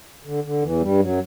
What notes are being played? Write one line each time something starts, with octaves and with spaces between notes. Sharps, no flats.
D3
D3
E2 E3
G2 G3
F#2 F#3